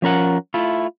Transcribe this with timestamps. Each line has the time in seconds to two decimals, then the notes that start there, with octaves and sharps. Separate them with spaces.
0.02 F3 C#4 A#4 F#5
0.54 A3 E4 F4